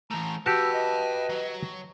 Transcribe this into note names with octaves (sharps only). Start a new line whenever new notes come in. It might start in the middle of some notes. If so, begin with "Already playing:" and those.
E3 A3 A#5
F#4 G4 B4 G5 A5 E6
D#5
F#3